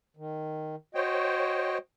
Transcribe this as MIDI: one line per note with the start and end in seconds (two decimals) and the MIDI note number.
0.17 0.76 51
0.95 1.77 66
0.95 1.78 72
0.95 1.78 73
0.95 1.77 75
0.95 1.78 79